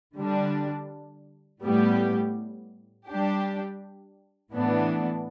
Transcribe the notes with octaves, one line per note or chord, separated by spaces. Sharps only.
D3 G3 D4
A2 G3 B3 G4
G3 D4 G4
A2 E3 B3 D4